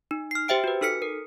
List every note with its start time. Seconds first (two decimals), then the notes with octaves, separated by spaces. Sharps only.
0.11 D#4
0.31 F6 C7
0.48 G4 C5 E5 G5 D7
0.64 F#4 B4
0.81 D#4 A4 F6 B6 C#7
1.02 A#4